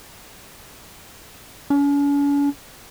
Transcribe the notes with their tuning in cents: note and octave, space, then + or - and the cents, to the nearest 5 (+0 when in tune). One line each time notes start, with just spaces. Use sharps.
C#4 +45